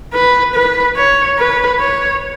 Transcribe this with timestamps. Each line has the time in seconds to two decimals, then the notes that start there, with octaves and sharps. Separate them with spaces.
0.14 B4
0.55 B4
0.97 C#5
1.38 B4
1.80 C#5